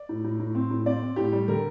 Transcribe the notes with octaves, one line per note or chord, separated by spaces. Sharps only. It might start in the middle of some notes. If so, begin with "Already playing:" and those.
Already playing: D5
A2
A2
A2
C4
A2
C4 D5
C4
A2 G4
G3
D3 A#4